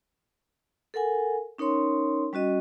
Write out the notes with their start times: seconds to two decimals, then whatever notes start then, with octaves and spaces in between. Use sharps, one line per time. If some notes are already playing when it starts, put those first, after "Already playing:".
0.94 A4 A#4 F#5 G#5
1.58 C#4 D#4 A#4 C#5 C6
2.33 G3 C#4 F#4 D#5